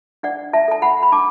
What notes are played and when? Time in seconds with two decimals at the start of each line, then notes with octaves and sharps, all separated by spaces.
0.23 D4 D5 F#5
0.53 E5 A5
0.68 A4 A5
0.82 F#5 B5
1.03 B5
1.12 D4 A5 D6